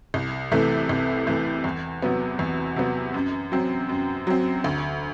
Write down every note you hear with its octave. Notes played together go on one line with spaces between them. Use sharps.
C2
C3 E3 A3
C2
C3 E3 A3
E2
C3 F#3 B3
E2
C3 F#3 B3
F#2
F#3 C4
F#2
F#3 C4
D2